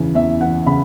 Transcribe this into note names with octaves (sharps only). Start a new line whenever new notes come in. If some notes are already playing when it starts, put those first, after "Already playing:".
Already playing: E2 C#3 E3
E2 E5
E3 F#5
C#3 B5